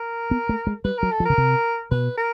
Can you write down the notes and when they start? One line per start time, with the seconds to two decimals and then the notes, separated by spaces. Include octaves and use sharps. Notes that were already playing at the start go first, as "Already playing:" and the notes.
Already playing: A#4
0.31 B3
0.49 A3
0.67 G#3
0.85 G3 B4
0.98 F#3 A#4
1.12 A4
1.20 F3
1.25 C#3 A#4
1.38 C3
1.91 B2 B4
2.17 A#4